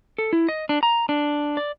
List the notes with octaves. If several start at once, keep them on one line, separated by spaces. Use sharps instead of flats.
A4
E4
D#5
D4
A#5
D4
D5